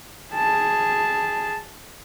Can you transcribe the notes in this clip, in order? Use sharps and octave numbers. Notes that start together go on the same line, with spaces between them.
G#4 A5